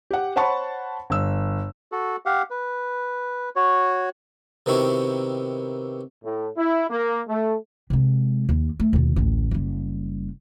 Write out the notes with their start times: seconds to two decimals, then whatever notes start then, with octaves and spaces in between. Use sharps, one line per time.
0.11 G4 F#5
0.36 C5 C#5 F#5 A5 B5 C#6
1.10 G1 E6
1.92 F#4 A4
2.26 G4 F5 F#5
2.50 B4
3.56 F#4 C#5
4.66 C3 D#3 B3 E4 F#4 G4
6.24 A2
6.56 E4
6.89 A#3
7.28 A3
7.90 C3 G#3
8.49 D#2
8.80 A3
8.93 D#2 B2
9.16 A1 D2
9.51 F#1 G3